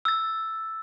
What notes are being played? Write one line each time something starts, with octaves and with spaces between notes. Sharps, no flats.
E6 A6